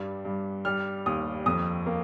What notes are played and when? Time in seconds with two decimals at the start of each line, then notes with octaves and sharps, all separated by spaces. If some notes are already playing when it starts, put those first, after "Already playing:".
Already playing: G2 G3
0.25 G2
0.65 G3 F6
1.06 D#2 D#6
1.46 F2 D#6
1.86 A#3